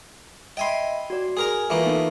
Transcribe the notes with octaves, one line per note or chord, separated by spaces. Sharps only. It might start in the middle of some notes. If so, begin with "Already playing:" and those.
D#5 E5 G5 G#5 B5 C6
F#4 D5
G#4 A#4 G#5 A#5
E3 A3 A#3 F4 B4 E5
B3 D#4 A4